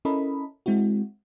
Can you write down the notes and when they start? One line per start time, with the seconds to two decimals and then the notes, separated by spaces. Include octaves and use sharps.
0.05 C#4 E4 A4 A#4 D#5 B5
0.66 G#3 C4 E4 F#4